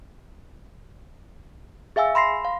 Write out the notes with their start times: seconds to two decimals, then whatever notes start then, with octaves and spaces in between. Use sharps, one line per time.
1.96 G#4 E5 F5 G#5 E6
2.15 B5 C6 A#6 C7
2.45 F5